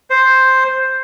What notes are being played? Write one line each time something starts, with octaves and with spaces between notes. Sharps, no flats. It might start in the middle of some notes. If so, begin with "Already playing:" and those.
C5